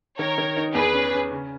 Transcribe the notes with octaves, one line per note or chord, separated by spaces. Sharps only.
D#3 A#4 C#5
D#3
D#4
E2 G#4 B4
C#4
C#4
C#3